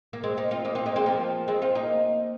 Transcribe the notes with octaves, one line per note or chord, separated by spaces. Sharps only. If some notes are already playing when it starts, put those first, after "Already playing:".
A#3
G#3 C4
A#3 D#4
C4 F4
A#3 D#4
C4 F4
A#3 D#4
G#3 C4
F3 A#3
G#3 C4
C4 F4
A#3 D#4